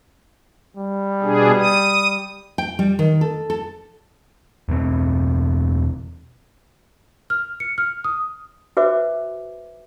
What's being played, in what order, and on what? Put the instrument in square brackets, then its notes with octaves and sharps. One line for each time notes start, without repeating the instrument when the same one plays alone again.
[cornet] G3
[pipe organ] B2 D4 G#4
D#6
[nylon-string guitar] G5
G3
D#3
A4
A4
[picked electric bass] E2 B2 A#3 C4
[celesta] F6
C#7
F6
D#6
[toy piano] F#4 B4 C5 E5 D6